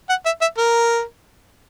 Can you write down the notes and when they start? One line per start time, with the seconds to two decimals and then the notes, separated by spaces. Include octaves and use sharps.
0.09 F#5
0.26 E5
0.41 E5
0.58 A#4